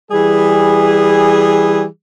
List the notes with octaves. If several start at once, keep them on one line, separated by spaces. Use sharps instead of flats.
E3 G3 G#4